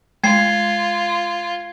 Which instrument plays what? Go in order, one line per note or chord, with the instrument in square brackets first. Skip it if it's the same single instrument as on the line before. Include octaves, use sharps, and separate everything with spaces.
[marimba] G#3 [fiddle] F4 [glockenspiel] G#6 C7